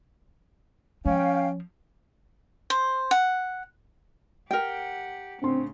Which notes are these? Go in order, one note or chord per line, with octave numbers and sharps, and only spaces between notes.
F3 C#4 F5 G5
C5
F#5
G4 A#4 F#5 G5
A2 C#3 C4 D4 C6